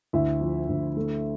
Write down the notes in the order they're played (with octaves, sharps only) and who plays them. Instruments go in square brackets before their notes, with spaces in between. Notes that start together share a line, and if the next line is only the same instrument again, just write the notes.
[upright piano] D2 E4 E5
F3
D2
A3